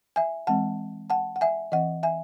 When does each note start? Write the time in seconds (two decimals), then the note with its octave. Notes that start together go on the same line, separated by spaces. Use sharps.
0.16 E5 G#5
0.47 E3 G#3 C4 F#5 A5
1.10 F#5 A5
1.36 F#5
1.41 E5 G#5
1.72 E3 C4 D#5 F#5
2.03 E5 G#5